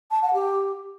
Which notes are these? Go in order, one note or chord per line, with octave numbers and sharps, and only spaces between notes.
A5
F#5
G4